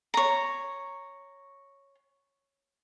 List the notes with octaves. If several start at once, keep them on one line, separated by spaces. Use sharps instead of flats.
C#5 A#5